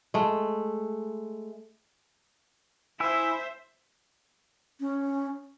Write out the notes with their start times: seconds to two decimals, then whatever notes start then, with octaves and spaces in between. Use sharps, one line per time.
0.14 G#3 A3
3.00 E4 C5 E5 G#5 E6
4.80 C#4